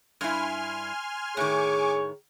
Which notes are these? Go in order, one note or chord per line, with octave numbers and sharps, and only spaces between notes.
G2 E4 G#5 C6 F6
A2 D#3 G#4 C#5 G#5 C#6 D6